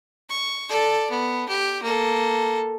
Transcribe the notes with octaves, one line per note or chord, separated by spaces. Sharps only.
C#6
A4 D5
B3
G4
A#3 A4